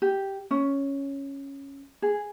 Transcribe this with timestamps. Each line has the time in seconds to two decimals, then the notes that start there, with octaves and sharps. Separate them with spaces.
0.02 G4
0.51 C#4
2.02 G#4